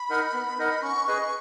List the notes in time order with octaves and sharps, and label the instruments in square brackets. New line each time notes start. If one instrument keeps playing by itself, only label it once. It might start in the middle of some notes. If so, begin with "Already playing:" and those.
Already playing: [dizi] B5
[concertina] D#4 A#4 D#5 F#5
B3
D#4 A#4 D#5 F#5
[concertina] C#4 [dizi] C#6
[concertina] G#4 B4 D#5